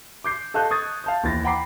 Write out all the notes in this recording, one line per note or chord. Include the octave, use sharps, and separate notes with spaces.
D6 G6 C7
A4 D#5 F5 A5 F#6 G6
C#6 D#6 G#6 A6
F5 A5 G6
D#2 E3 A6 A#6
F#5 G5 A#5 B5 D6 C7